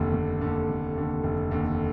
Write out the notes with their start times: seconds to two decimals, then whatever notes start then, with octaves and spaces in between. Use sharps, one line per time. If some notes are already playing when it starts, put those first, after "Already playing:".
Already playing: F1 D#2 D3
0.13 F1
0.41 D#2 D3
0.69 F1
0.96 D#2 D3
1.24 F1
1.51 D#2 D3